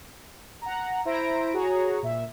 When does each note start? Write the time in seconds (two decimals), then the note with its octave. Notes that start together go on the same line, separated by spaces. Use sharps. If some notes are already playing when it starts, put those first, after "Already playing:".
0.62 F#5 A#5
1.05 E4 C5 E5 A#5 A#6 D7
1.53 F#4 G#4 C#5 A#5
2.02 A#2 E5